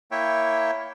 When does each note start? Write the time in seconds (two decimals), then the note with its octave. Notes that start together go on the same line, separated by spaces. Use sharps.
0.11 A#3 E4 C#5 E5 G5